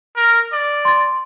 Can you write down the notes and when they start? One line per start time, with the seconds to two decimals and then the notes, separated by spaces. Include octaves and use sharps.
0.17 A#4
0.53 D5
0.85 C6 A6